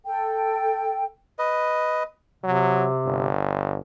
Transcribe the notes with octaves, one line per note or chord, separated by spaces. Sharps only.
A4 G5
B4 D#5
C3 F#3
G1